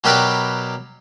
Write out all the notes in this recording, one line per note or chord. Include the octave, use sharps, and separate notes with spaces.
B2 F#3 G4 A#4 B4 D5